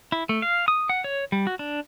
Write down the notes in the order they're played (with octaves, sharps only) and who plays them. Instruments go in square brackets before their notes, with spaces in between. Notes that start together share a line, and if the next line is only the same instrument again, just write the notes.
[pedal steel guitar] E4
A3
F5
D#6
F#5
C#5
G3
F#4
D4